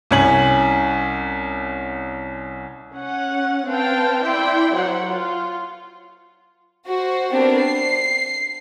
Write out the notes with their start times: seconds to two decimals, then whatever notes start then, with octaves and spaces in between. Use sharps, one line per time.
0.11 C2 C#4 F#7
2.94 C#4 F#5
3.69 C4 B4 F5 G5 A5
4.24 E4 D5 E5 G5 C6
4.76 F#3 C5 C#5 F#5
5.10 F4
6.85 F#4 C5
7.31 B3 C4 D4 G4 A#4
7.59 C7